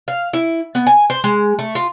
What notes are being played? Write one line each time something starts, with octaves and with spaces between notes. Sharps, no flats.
F5
E4
B3
G#5
C5
G#3
A3
F4